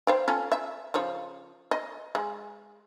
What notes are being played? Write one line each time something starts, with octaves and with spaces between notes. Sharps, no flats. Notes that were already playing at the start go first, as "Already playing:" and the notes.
C5 F5 G5
C#4 F4 A4
E5
C#3 F3 C#5
D#5
G#3